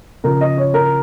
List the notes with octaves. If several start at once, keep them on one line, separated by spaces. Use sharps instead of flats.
C#3 F3 A#4
D#5
C#5
A#4